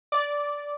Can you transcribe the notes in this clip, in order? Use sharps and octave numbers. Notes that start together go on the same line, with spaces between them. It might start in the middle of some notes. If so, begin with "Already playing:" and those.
D5